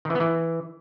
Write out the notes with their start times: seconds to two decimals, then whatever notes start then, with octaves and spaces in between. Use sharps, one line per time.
0.05 D#3
0.10 E3
0.15 B3
0.20 E3